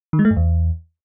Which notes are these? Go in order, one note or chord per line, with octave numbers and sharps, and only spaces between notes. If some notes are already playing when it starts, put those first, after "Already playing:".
D#3
G#3
A3
G2
E2